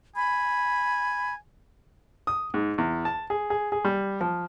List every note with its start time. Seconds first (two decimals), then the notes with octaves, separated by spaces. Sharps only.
0.16 G#5 B5
2.27 D#6
2.54 G#2
2.78 E2
3.05 A5
3.30 G#4
3.50 G#4
3.72 G#4
3.85 G3
4.21 F3